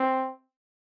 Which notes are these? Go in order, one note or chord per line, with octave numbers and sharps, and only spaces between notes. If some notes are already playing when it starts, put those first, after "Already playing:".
Already playing: C4